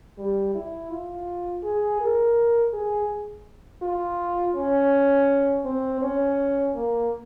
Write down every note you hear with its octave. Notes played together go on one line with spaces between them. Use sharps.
G3
E4
F4
G#4
A#4
G#4
F4
C#4
C4
C#4
A#3